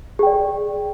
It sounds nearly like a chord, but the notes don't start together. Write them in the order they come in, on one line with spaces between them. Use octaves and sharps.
G#4 G5 D5